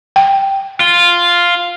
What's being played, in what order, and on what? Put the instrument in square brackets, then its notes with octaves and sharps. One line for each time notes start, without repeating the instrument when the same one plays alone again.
[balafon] G5
[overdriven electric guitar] F4